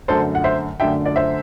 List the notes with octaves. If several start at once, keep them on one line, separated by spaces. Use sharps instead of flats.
F#2 D3 A3 A4 C5
F#5
C5 E5
F#2 D3 A3 E5 G5
D5
C5 E5